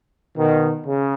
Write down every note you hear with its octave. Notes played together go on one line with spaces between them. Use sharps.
B2 D#3
C#3